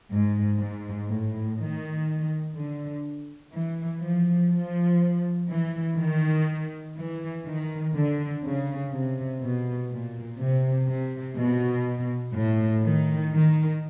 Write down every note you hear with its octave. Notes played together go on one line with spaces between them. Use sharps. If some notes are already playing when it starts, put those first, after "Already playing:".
G#2
G#2
A2
D#3
D3
E3
F3
F3
E3
D#3
E3
D#3
D3
C#3
C3
B2
A#2
C3
C3
B2
A2
D#3
D#3